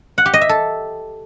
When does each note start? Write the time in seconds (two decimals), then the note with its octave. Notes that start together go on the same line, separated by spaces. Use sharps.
0.18 F#5
0.26 G4
0.34 D#5
0.41 E5
0.49 A4